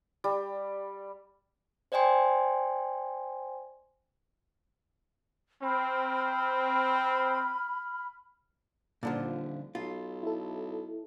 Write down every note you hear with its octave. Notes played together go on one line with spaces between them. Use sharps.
G3
C5 D5 D#5 G5 G#5 C6
C4 B5 F6
D#1 A#2 D3 F3
B1 F4
E4 A4